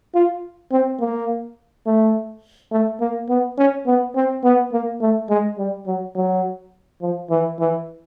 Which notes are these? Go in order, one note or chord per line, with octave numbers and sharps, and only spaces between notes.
F4
C4
A#3
A3
A3
A#3
B3
C#4
B3
C4
B3
A#3
A3
G#3
G3
F#3
F#3
F3
E3
E3